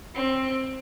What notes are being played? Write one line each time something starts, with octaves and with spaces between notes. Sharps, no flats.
C4